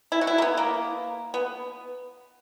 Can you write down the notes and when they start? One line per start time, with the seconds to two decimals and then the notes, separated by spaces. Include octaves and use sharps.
0.12 E4
0.21 F#4
0.27 E4
0.38 A#3
0.42 B3
0.57 A#3
1.34 B3